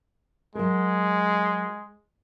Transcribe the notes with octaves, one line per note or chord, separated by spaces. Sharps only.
F#3 G#3 A#4